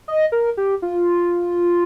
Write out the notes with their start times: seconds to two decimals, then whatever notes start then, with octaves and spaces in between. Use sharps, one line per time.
0.08 D#5
0.32 A#4
0.57 G4
0.82 F4